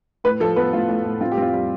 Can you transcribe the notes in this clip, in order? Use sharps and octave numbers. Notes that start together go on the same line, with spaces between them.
A2 B4
F3 A4
B3 B4
A2 F4
A2
A2
C4 F4
G4
C4 F4
G3